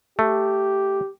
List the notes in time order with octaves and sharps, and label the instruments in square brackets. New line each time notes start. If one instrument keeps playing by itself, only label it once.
[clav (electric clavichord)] A3 [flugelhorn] G4